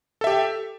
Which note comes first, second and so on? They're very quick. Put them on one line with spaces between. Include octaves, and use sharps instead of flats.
A4 E5 G4